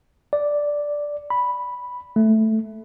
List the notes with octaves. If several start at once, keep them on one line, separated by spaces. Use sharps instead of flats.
D5
B5
A3